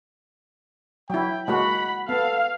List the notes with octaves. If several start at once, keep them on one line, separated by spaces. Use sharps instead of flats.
F#3 E4 G5
G#3 A#3 F#4 F#5 B5
B3 A4 F5